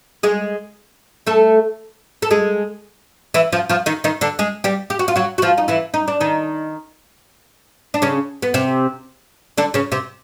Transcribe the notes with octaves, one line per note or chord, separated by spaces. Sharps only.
G#3 G#4
A3 A4
A4
G#3 G#4
E3 E4
F3 F4
F3 F4
D#3 D#4
D#3 D#4
D3 D4
G#3 G#4
G3 G4
G4
F#4
F4
F#3 F#4
F#4
F3 F4
D#4
E3 E4
D#4
D4
D#3 D#4
D4
C#3 C#4
B3
C3 C4
D3 D4
C#3 C#4
C3 C4